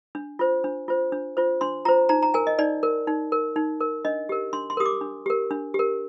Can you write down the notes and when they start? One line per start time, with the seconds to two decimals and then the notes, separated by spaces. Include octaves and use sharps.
0.15 D4
0.39 F4 C5
0.64 D4
0.88 F4 C5
1.12 D4
1.37 F4 C5
1.61 D4 C6
1.85 F4 C5 A#5
2.09 D#4 A#5
2.23 A#5
2.34 A#4 G#5
2.47 D#5
2.59 D#4 D5
2.83 A#4
3.07 D#4
3.32 A#4
3.56 D#4
3.80 A#4
4.05 D4 D#5
4.29 G4 A#4
4.53 D4 C6
4.70 C6
4.77 G4 A#4 D#6
4.85 D6
5.01 D4
5.26 G4 A#4
5.51 D4
5.74 G4 A#4